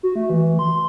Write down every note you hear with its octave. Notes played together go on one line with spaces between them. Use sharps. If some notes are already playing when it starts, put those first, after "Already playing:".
F#4
A3
E3
C6